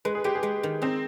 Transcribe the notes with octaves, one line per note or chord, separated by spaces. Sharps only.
G#3 B4
G#4
G#3 G4
G#4
G#3
D#3
C4 D#4